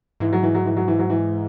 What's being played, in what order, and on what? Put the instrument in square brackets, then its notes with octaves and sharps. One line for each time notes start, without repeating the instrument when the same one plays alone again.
[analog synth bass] G#2 [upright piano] E3
[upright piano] F#3
E3
F#3
E3
F#3
E3
F#3
E3